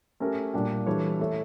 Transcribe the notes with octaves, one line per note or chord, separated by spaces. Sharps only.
A3 C#4 G4 A#4
A#2 G3 A#3 D4 G4
E3 G3 D4 A4 C#5
A3 E4 A4 C#5